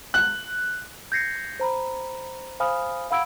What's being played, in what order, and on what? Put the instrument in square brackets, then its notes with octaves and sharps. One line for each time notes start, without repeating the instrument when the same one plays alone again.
[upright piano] F#6
[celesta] G6 G#6 A#6 C7 C#7
C5 A#5 B5
C5 F5 G#5 B5 D#6 F6
F5 F#5 B5 E6 G#6 D7